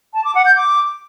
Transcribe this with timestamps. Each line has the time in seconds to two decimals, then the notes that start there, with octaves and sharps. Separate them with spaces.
0.14 A5
0.24 D6
0.35 F#5
0.46 G6
0.56 D6